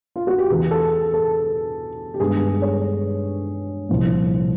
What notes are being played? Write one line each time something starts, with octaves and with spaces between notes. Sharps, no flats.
F4
F#4
G4
E2 C#3 E3 G#4
A4
A4
G4
G2 D#3 G#3 B3 G#4
C#5
C2 A#2 F3 A#3